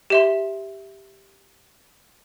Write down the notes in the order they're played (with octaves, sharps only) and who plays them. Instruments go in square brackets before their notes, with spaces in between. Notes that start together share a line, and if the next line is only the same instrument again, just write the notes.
[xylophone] G4 E5 C6